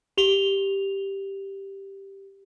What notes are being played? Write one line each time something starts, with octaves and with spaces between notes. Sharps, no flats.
G4 F7 G7